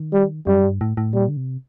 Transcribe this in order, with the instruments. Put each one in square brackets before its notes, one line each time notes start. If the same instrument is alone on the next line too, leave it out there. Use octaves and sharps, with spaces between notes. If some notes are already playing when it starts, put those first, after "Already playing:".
Already playing: [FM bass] D#3
[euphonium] G3
[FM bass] F#2 [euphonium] G3
[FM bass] G2
A2
A2
[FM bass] A#2 [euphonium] G3
[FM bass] D3
C3